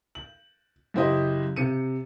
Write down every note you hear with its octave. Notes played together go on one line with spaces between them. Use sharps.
F#7
F#2 C#3 E4 G4 C5 D#5
C3 C#7 D#7